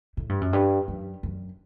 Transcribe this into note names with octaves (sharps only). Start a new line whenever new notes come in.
A2
G2
F#2
G2
F#2
F#2